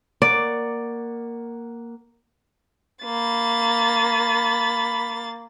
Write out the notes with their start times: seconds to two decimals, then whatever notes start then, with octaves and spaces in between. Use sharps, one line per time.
0.22 A#3 D5 F#5 C#6
3.04 A#3 B5 A6